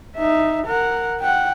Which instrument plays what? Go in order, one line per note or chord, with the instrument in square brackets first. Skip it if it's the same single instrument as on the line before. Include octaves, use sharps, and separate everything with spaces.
[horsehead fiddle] D#4 E5
A#4 F#5
F#5 G5